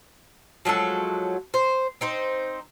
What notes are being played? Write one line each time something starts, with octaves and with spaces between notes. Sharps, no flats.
F3 F#3 G#3 A4
C5
C4 D#4 C5